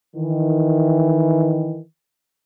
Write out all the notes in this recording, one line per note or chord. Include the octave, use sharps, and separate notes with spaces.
D#3 E3